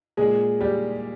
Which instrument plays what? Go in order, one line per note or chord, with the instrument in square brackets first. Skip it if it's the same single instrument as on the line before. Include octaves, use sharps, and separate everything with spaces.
[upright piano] A#2 G#3 G#4
G3 G4